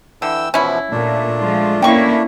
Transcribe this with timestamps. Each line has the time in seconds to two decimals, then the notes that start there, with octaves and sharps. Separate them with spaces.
0.22 D3 E3 G5 E6
0.54 B2 E3 F3 C#4 E4
0.92 A#2 A3 D4
1.39 F3 G#3 F4
1.82 A#3 C#4 E4 G5 C#6